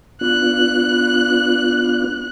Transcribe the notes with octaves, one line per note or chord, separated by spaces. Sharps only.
B3 D4 F4 F#6